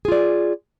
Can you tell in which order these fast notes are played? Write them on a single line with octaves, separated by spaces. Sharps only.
G#4 F4 D5